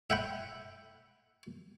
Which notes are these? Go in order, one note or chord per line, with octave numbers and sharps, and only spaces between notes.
E5 F#5 G5 B5